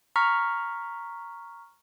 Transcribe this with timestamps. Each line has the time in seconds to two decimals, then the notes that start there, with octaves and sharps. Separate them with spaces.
0.16 A#5 C#6 F6 B6